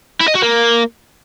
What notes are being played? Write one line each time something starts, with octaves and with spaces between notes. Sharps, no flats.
E4
D#5
F#4
A#3